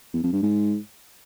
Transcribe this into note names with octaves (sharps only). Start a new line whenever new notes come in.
E2
F2
G2
G#2